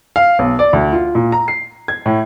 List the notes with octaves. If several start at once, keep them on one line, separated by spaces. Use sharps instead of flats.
F5
B1
D5
D2
F4
A#2
A#5
C7
G#6
A2